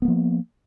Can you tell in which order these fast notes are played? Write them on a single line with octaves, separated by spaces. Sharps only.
B3 A#3 F3